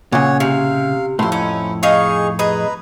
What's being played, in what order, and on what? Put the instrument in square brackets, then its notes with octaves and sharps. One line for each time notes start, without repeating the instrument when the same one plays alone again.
[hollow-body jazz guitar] A#2 C#3 [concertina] C#5 F#5
[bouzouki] C3 [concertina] F5
[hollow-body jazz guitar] F2 A2 [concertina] E4 C6
[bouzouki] C#4 D#4 [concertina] E4
[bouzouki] D#4 G#4 F5 [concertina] C#6
[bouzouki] G#4 D#5 [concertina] B4 A#5 B5